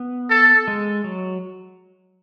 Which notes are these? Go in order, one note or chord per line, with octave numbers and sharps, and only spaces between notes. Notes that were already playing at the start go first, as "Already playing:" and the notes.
Already playing: B3
A4
G#3
F#3